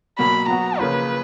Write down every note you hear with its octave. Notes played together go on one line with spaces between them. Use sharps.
B2 F#3 A#3 B5
F#3 B3 F#4 A#5
C#3 F3 A#3 F4 B4